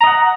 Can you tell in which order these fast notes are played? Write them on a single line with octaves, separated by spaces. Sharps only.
A#5 D#5 F#5